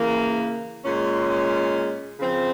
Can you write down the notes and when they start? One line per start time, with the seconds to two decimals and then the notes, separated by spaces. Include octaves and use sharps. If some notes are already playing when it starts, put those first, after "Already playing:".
Already playing: C#3 E3 A#3
0.85 A#2 G#3 C#4
2.19 C#3 F3 C4